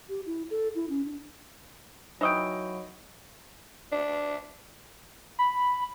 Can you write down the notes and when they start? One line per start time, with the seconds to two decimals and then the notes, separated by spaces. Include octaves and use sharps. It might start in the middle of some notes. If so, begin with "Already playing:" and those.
0.09 G4
0.26 E4
0.50 A4
0.75 E4
0.89 C#4
1.05 D4
2.21 E3 F#3 D#4 D#5 G5 B5 C#6 D7
3.92 D4
5.39 B5